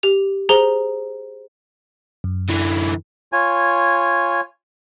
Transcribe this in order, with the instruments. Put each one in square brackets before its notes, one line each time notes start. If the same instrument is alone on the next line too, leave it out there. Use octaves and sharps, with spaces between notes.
[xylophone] G4 F7
G#4 C5 A#5 F7 G7
[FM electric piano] F#2
[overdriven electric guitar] D3 E3
[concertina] F4 C#5 G#5